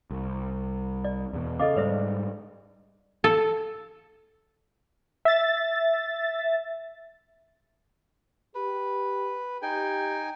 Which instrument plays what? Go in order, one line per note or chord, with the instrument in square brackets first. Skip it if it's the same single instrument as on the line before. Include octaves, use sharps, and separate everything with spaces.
[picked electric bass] C2
[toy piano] D5
[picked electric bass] E2 B2
[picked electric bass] C#3 [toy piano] A4 D#5 D6 [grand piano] F5
[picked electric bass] G#2 G3 [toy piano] B4 C5 E5 [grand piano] D5
[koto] A4
[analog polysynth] E5 A6
[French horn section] G4 [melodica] B4
[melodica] D#4 G#5 [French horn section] G4 [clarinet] G5